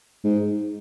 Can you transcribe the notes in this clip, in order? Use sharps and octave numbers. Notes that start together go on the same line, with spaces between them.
G#2